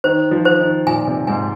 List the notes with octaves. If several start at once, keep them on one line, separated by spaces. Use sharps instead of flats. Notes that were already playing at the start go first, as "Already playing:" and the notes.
D#3 C5
F3
C5
D#3
A#2 G#5
C3
G#2 G#5